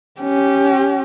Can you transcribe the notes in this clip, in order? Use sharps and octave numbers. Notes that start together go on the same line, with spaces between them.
C#4 G4